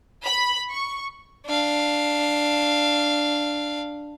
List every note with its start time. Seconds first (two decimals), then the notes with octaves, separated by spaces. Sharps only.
0.24 B5
0.71 C#6
1.45 D4 F5